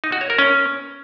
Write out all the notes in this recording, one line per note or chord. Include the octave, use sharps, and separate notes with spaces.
D#4
F#4
C#5
A#4
C#4